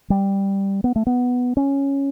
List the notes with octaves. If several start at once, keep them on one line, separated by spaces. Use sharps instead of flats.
G3
B3
A3
B3
C#4